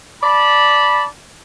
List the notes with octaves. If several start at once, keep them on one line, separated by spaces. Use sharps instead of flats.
D5 A5 B5